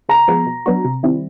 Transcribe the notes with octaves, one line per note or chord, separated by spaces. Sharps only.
C#3 A#5
F3 G#3 B3
B2
F#3 B3 D4 F#4
C3
D#3 G3 C4 E4